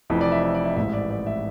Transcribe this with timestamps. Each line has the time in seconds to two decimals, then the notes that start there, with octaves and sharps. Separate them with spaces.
0.10 F1 F2 E3
0.21 D5
0.32 E5
0.43 E5
0.54 D5
0.65 E5
0.76 A1 G#2 E3 E5
0.93 D5
1.10 D5
1.27 E5